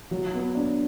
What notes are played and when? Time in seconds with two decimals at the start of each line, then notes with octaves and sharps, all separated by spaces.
0.11 F#3
0.34 B3
0.55 D4